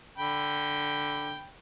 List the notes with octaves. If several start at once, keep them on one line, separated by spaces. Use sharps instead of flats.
D3 G5 B5